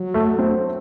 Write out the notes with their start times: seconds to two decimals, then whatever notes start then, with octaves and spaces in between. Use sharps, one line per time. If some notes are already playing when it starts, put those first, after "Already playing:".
Already playing: F#3
0.14 A3
0.39 C4